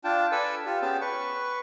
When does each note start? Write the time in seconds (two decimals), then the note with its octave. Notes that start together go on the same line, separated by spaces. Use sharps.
0.04 D4 F4 G5 A5
0.32 A4 B4 D5 G#5 E6
0.66 F4 G4
0.82 B3 C#4 G4 G#4 G5 A5
1.01 B4 C#6